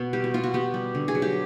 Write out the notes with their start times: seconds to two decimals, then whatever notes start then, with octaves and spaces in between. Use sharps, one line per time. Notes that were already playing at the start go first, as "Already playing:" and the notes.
Already playing: B2 B3
0.13 G3 G4
0.24 F#4
0.34 B3 F4
0.43 F#4
0.54 B3 G4
0.74 G3
0.95 D3
1.08 G#4
1.15 F#3
1.22 G4